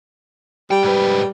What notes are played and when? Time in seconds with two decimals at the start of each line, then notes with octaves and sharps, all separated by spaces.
0.71 G3 G5
0.83 G#2 B4